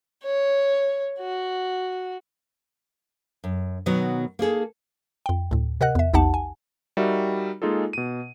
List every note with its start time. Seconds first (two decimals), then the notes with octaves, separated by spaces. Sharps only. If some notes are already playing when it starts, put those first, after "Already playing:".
0.23 C#5
1.19 F#4
3.44 F#2
3.86 B2 D#3 F#3 B3
4.39 A#3 D#4 G#4 A4
5.26 F2 G5
5.51 D2 A2
5.81 C3 A#4 D#5 F#5 F#6
5.95 E2 E5
6.14 A#1 E2 D#4 G4 F#5 A5
6.34 G#5
6.97 G3 D#4 F#4 A#4 E5
7.62 G#3 A#3 D#4 F4 G#4 A4
7.93 B2 D#7